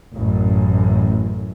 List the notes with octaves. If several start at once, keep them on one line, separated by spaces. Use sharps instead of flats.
A1 F#2 A2